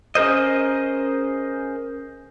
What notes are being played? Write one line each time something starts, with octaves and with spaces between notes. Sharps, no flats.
C#4 G#4 A#4 C5 D#5